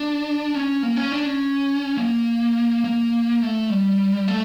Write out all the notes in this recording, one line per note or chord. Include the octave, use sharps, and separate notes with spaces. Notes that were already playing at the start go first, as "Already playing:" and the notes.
Already playing: D4
C#4
A#3
C#4
D4
C#4
A#3
A#3
A3
G3
A3